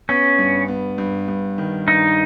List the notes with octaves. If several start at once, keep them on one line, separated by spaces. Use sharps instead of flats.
B3 C#4
G2
B3
G2
G2
D#3
G2 D#4